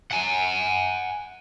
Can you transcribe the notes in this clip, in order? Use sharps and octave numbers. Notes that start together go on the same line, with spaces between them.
F#5 G#5